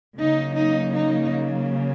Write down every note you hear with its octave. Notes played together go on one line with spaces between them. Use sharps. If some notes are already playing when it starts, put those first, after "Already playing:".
C#3 F#3 A#3 D#4
D#4
D#4